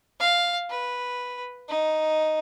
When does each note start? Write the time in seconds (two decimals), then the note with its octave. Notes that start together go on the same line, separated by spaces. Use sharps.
0.20 F5
0.70 B4
1.69 D#4